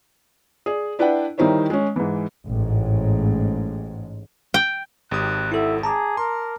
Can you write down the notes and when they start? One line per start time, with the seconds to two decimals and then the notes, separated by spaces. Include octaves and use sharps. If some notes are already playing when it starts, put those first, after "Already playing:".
0.66 G#4 D5
0.99 D4 E4 B4 D5 F#5 G5
1.38 D#3 G3 D#4 E4 C5 C#5
1.70 G#3 C#4
1.96 G#2 E3
2.48 A1 G#2
4.54 G5
5.11 G#1 G4 D#6 F#6
5.52 E4 A4 E5 F#5
5.83 G#4 A5 A#5 D6
6.17 A#4 C6